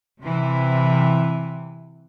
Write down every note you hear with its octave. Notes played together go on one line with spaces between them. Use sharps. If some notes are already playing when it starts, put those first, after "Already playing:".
C3 E3